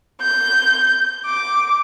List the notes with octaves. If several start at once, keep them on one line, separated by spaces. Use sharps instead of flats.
G6
D6